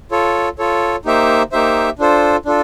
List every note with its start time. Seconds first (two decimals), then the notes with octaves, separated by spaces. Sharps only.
0.12 F4 A4 C#5
0.59 F4 A4 C#5
1.05 A#3 D#4 G4 C5 E5
1.52 A#3 D#4 G4 C5 E5
1.99 D4 F4 A4 C5
2.46 D4 F4 A4